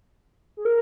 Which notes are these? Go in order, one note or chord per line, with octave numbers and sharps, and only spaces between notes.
G#4
A#4